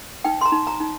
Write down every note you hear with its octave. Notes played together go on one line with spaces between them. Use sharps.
D#4 G5
C6
A#5
D#4
A#5
D#4